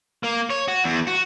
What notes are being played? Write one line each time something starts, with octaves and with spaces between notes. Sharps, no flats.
A#3
C#5
F#4
E2
F#4